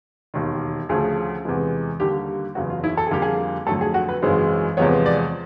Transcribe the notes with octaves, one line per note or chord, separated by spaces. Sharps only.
E1 D#2 D#3
D2 C#3 F3 A3 G#4
E2 C3 E3 G#3
D#2 D3 G3 A#3 G4
F#1 E2 C#3 F#3 F#4
F4
E4
A4
G#4
F2 D3 G3 A#3 G4
G#4
F2 D3 F#3 A3 A4
G#4
F#4
B4
G#1 F#2 C#3 E3 G#3 C5
E2 C3 F3 G#3 B3 C#5
D5